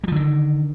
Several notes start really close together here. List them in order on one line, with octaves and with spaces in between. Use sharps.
G3 F3 D3 D#3